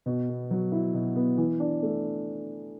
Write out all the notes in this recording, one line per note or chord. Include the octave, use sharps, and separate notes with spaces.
B2
B3
F#3
E4
B2
B3
E3
D4
A3